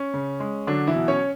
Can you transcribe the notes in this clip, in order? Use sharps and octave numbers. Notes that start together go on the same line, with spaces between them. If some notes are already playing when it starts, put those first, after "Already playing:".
Already playing: C#4
C#3
G#3
D3 F#3 D4
E3 E4
B2
C#4 C#5